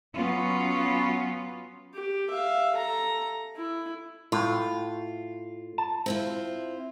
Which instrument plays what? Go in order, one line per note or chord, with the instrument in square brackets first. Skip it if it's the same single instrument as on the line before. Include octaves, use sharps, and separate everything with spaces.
[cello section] F#3 B3 C#4 F4
[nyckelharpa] G4
E5 F5
A4 A#5
E4
[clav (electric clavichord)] A2 [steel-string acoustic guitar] F4
[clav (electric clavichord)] A5
[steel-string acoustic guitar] C4 E4 F4